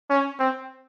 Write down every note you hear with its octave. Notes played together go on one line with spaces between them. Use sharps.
C#4
C4